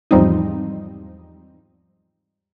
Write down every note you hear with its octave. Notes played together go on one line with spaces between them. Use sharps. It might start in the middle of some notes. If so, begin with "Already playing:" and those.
E2 G#2 F3 G3 C4 D#4